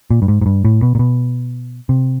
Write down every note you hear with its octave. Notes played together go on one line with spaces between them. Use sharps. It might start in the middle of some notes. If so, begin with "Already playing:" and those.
A#2
G2
G#2
G#2
G2
A2
B2
A#2
B2
C3